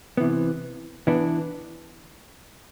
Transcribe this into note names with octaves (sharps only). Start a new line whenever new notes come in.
C3 E3 B3
E3 B3 D4